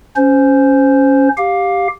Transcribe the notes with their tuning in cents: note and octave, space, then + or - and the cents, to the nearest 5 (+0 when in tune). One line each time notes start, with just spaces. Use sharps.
C#4 +0 C5 -10
G4 +0 F5 +15